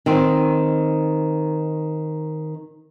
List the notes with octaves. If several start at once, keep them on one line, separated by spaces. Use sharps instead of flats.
D#3 C4